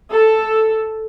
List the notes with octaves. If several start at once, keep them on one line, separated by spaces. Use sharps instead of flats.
A4